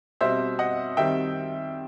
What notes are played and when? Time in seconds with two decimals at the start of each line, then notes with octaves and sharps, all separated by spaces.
0.21 B2 G3 C4 C5 E5
0.59 D#5 F#5
0.97 D#3 G3 C4 E5 G5